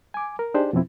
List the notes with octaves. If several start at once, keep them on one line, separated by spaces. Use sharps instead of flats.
G#5 D6
A#4
D4 D#4 G4 G#4 C5 D5
F2 B2 F3 C4 E4